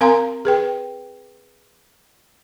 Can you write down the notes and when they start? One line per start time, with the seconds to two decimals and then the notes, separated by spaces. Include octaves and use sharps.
0.01 C4 A#4 F5 G#5 A#5 C6
0.45 G#4 B4 G5